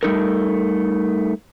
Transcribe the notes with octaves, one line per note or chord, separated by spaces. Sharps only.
G3 A3 D#4 A4 A#4